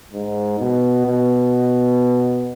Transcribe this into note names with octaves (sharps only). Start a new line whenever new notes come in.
G#2
B2
B2